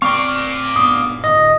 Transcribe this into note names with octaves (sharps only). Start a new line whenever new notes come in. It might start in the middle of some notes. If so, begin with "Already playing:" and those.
C4 D5 F5 C#6
G2 A#2 B3 D#6
A2 D3 D#5